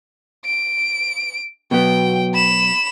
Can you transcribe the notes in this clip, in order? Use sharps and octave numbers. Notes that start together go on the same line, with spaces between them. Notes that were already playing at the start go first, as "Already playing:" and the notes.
D7
B2 F#3 B3 G5
B5 E7